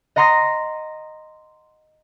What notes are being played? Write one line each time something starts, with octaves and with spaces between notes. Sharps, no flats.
D#5 F#5 A#5 C6 D#6 A#6